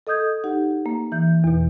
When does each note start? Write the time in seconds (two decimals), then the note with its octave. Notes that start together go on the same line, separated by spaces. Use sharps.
0.07 A4 D#5 D#6 G6 G#6
0.44 D#4 G4 F#5
0.86 A#3
1.12 E3 G6
1.44 E2 B2